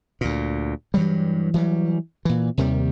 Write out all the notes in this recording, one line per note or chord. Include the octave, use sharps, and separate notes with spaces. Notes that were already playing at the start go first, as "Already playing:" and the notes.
D2 A#2
G2 E3 F#3 G3
E3 F#3 G3
A#2 E3
D#2 C3 D#3 G3